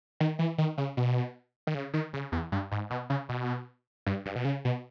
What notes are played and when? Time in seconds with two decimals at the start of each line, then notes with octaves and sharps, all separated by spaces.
0.20 D#3
0.39 E3
0.58 D#3
0.78 C#3
0.97 B2
1.67 D#3
1.74 C#3
1.93 D#3
2.13 C#3
2.32 E2
2.52 G2
2.72 G#2
2.90 B2
3.10 C#3
3.29 B2
4.06 G2
4.26 G2
4.35 B2
4.45 C#3
4.65 B2